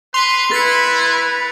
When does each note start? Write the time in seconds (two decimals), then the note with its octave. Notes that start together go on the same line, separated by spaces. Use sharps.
0.14 B4 C6 F7
0.51 E4 B4 A6 B6 C#7